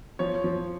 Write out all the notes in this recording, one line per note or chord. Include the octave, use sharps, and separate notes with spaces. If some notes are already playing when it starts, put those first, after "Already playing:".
F3 C#5
F3